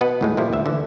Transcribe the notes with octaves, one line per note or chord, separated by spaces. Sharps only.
B2 B3 B4 D#5 F#5 A5
D#2 A2 G#3
A#2 F3 G3 E4
D2 E5
D3 E3